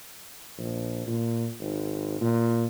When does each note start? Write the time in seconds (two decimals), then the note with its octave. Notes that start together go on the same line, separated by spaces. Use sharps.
0.58 A#1
1.07 A#2
1.60 G#1
2.21 A#2